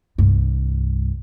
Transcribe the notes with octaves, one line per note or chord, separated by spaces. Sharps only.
C2 G2